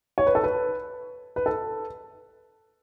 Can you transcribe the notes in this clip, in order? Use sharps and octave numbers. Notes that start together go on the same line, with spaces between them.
C#5
B4
A4
B4
B4
A4